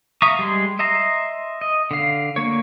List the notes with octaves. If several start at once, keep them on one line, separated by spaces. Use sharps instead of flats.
E5 F5 A#5 C#6 D#6
G3 G#3 C6
D#5 E5 A#5 C6
D#5
D3 F5
D3 A#3 C#5